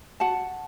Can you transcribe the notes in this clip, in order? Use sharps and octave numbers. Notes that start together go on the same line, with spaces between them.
F#4 F#5 A5